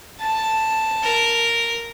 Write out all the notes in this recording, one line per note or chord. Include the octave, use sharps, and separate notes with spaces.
A5
A#4